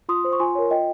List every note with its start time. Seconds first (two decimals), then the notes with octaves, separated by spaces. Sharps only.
0.09 F4 C6 D#6
0.24 C5
0.33 C#6
0.40 F4 G#5 C6
0.55 A#4 C#5
0.71 F4 D#5 G5